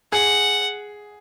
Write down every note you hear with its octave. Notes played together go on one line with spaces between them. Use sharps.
G#4 F#5